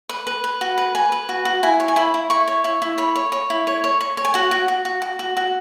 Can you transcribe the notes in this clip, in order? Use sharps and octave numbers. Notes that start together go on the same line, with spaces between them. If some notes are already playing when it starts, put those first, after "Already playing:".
B4
B4
B4
F#4
B4
B4 G#5
B4
F#4
F#4
E4 G#5
C#5
G#5
E4 B5
E4
E4 C#6
C#5
E4 C#6
E4
C#5 B5
C#5
C#5
E4
C#5
C#5
C#5
C#5
G#5
F#4 F#5
F#4
F#4
F#4
F#4
F#4
F#4